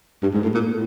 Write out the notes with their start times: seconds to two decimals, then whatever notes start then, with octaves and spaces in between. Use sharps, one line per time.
0.23 G2
0.33 G#2
0.43 A2
0.54 A#2
0.70 A2